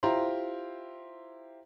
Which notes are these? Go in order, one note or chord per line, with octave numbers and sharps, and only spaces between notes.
E4 F4 G4 C5 A#5 C6